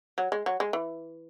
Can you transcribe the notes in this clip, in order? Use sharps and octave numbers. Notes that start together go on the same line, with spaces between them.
F#3
G#3
F#3
G#3
E3